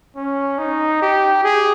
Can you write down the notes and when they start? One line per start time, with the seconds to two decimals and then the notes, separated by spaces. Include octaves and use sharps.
0.16 C#4
0.58 D#4
1.02 G4
1.44 G#4